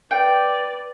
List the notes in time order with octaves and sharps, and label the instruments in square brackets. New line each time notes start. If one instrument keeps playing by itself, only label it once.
[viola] B4 D5 [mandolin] G5